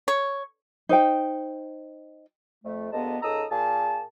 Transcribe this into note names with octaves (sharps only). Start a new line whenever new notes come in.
C#5
D#4 C5 G5
F2 A3
D2 G#3 A#3 B3 D#5 A5
C#2 D#4 A4 A#5 D#6 E6
A#2 A#3 G#4 A5